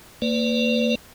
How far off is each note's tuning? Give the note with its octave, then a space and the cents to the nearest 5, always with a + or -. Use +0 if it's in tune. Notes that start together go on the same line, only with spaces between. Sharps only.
A#3 -25 B4 +30 D5 -20